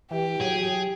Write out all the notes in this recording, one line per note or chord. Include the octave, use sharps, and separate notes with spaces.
E3 G4
F#3 G#4